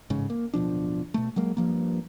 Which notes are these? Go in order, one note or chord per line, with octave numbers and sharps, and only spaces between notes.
A1 G#2 C#3
A#3
D1 B2 F3 D4
B2 A3
F#3 G#3 A#3
G2 F3 A#3